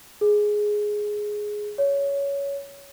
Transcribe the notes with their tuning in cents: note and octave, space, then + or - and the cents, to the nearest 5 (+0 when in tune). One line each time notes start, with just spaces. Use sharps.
G#4 +5
C#5 +15